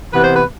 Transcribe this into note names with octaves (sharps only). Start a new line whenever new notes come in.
C3 E3 B3 B4
C5
B4